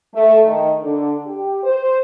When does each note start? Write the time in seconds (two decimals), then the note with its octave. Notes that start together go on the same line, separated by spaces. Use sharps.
0.14 A3
0.45 D#3
0.82 D3
1.26 G4
1.63 C5